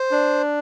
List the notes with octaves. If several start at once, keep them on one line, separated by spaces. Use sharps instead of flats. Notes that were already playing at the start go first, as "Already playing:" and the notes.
Already playing: C5
D4